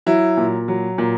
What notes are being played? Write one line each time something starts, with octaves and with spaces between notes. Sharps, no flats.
F#3 E4
A#2
F#3
A#2